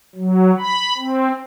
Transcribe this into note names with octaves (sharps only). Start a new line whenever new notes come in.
F#3
B5
C4